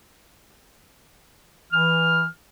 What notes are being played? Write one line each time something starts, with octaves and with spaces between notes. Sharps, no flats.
E3 F6